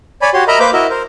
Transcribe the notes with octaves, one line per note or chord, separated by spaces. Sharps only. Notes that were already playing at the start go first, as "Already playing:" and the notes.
C#5 D5 G#5 B5
F#4 G4 C#5 C6
A#4 D#5 E5 A#5 B5
A#3 B4 C5 D6 G6
E4 F#4 A#4 D#5 E5
A#4 C5